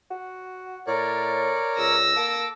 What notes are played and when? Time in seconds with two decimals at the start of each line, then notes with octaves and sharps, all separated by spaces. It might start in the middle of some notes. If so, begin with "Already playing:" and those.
0.10 F#4
0.87 A2 A#4 C#5 D5
1.77 C#2 E6 A#6
2.16 A#3 A4 D6